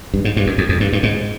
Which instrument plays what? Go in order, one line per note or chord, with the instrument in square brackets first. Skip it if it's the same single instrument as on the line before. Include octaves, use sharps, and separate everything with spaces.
[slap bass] G2
G#2
G2
F#2
F2
F2
G2
G2
G#2